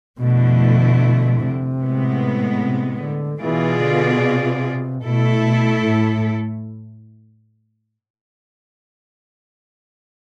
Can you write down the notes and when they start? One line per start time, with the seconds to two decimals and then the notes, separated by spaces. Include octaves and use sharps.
0.19 F2 B2 D3 F3 A3 E4
1.40 C3
1.81 A2 G#3 B3
2.61 C3
3.01 D3
3.41 B2 E3 B3 F4 G#4 D5
3.82 D3
4.23 C3
5.03 B2 A3 E4 A4
5.43 B2
5.83 A2